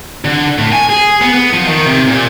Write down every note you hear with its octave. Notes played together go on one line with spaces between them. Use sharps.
D3
A2
G#5
G#4
B3
B3
F3
D#3
C3
A#2